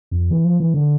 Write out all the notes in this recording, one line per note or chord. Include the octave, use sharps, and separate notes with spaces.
F2
E3
F3
E3
D3